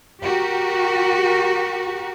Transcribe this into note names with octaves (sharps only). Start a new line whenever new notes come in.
F#4 G4 A#4